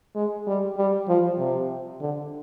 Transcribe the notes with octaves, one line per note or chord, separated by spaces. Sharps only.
G#3
G3
G3
F3
C3
D3